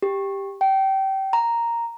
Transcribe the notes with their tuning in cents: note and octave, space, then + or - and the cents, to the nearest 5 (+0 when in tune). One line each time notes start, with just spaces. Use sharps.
G4 +5
G5 -25
A#5 +0